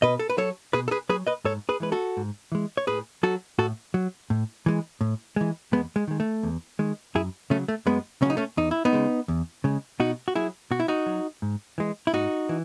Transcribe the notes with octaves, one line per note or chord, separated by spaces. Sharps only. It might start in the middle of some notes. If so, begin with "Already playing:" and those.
B2 B4 D#5
A4
B4
F#3 A4 C#5
B2 G#4 B4
A4
G#4 B4
F#3 G#4 B4
B4 D#5
G#2 A4 C#5
G#4 B4
E3 G#3 B4
F#4 A4
G#2
E3 G#3
C#5
A2 G#4 B4
F#3 F#4 A4
A2 F#4 A4
F#3
A2
E3 G#3
A2
E3 G#3
E2 G#3 B3
G#3
D#3 G#3
A3
E2
D#3 G#3
F#2 E4 G#4
C#3 F#3 A3 C#4
A3
F#2 G#3 B3
C#3 F#3 C#4 D#4
A3 C#4
E2 D#4
E4
B3 D#4
C#3 G#3
E2
C#3 G#3
B2 D#4 F#4
F#4
F#3 E4 G#4
B2 F#4
E4
D#4 F#4
F#3
G#2
E3 G#3
E4
G#2 D#4 F#4
E3